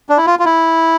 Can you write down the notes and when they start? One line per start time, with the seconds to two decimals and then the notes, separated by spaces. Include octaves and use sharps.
0.09 D4
0.17 E4
0.27 F4
0.39 F4
0.45 E4